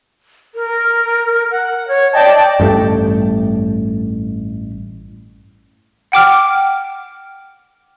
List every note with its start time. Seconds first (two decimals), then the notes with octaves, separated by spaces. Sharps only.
0.55 A#4
1.51 F#5
1.88 C#5
2.13 D5 D#5 G5 A5
2.60 A1 G2 A3
6.12 F#5 G5 D6 F6